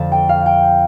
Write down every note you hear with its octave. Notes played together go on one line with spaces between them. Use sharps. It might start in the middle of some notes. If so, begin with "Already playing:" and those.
Already playing: F2 D3 F3 A5
G5
F5
G5